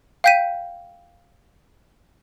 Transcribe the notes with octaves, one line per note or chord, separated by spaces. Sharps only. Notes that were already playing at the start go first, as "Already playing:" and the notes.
F5 G5 G6 B6 D#7